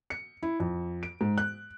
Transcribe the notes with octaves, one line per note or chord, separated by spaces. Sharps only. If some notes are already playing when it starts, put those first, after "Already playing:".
C#7
E4
F2
D7
G#2
F#6